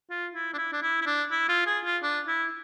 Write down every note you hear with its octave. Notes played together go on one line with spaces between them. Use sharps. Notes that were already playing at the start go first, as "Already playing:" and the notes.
F4
E4
D4
E4
D4
E4
E4
D4
E4
F4
G#4
F4
D4
E4